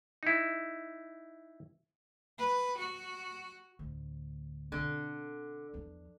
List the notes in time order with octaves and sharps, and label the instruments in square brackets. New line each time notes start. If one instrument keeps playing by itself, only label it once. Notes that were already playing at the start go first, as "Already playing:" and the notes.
[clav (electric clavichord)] D#4 E4
[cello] B4
F#4
[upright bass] D2 A2
[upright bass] B2 C4 [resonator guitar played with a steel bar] D3
[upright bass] E2 F3